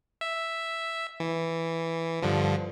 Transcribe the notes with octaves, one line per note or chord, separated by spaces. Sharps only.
E5
E3
G2 D3 F3